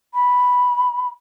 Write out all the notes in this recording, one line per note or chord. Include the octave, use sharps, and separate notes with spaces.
B5